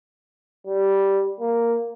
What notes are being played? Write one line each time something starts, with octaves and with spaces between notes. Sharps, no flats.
G3
A#3